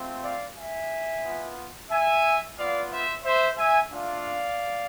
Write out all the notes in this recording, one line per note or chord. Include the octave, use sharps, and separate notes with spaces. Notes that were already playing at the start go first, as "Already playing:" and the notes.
Already playing: A3 C4 F4
D5 F5
E5 G#5
B3 F4
E5 G#5
B3 F4 D5 F5
C5 E5
C5 E5
E5 G#5
A3 D4 F4 D5 F5